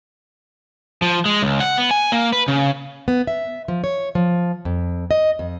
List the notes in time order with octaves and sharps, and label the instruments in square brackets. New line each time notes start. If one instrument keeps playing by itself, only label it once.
[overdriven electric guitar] F3
G#3
C#2
F#5
B3
G#5
A#3
B4
C#3
[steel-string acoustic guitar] B3
E5
F3
C#5
F3
F2
D#5
F2